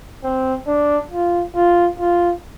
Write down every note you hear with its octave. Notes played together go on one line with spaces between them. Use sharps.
C4
D4
F4
F4
F4